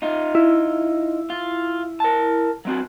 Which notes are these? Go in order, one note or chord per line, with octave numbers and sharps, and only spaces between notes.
D#4 F4
E4
F4
A#4 A5
F#3 C4 F#4